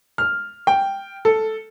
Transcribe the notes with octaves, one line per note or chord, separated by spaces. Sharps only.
F6
G5
A4